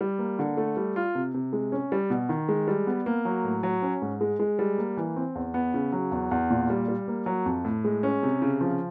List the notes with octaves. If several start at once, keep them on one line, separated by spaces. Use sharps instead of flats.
G3
A#3
D3
A3
G3
F4
C3
C3
G#3
C#4
G3
B2
D#3
G#3
G3
B3
A#3
F#3
A2
F#3
C#4
G#2
G#3
G#3
G3
A#3
E3
C4
E2
B3
C#3
F#3
E2
E2
A#2
G3
G3
A#3
F#3
F2
A2
G#3
C#4
C3
C#3
F3